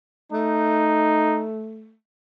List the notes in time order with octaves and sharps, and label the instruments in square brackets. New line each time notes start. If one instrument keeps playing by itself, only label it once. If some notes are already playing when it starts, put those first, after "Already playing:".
[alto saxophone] A3 [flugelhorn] D#4